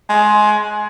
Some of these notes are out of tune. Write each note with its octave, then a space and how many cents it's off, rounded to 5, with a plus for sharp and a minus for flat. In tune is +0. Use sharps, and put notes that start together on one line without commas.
G#3 +20